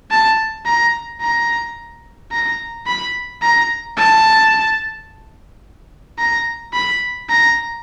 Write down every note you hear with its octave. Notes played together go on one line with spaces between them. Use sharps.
A5
A#5
A#5
A#5
B5
A#5
A5
A#5
B5
A#5